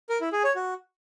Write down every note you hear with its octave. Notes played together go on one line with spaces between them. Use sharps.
A#4
E4
G#4
C#5
F#4